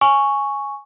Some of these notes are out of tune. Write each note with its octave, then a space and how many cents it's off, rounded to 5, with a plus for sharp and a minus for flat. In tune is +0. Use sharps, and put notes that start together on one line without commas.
G#5 +0 C#6 +0